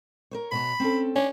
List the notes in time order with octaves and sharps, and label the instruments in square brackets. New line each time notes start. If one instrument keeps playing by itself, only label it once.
[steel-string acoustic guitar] A#4 C5 C#5
[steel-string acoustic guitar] B2 F#4 C#5 [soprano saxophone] B5
[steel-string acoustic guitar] C4 C#4 A4
[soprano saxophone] C#4 [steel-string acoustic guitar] D4